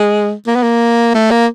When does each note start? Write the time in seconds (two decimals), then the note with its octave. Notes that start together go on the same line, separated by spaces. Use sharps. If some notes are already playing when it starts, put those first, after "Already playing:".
Already playing: G#3
0.47 A#3
0.56 B3
0.63 A#3
1.15 A3
1.31 A#3